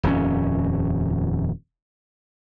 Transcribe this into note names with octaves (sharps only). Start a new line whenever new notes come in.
D#1 F2 G3 C#4